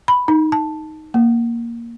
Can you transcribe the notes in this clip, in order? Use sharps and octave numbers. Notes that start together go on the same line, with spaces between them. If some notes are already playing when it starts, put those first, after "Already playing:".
B5
D#4
A5
A#3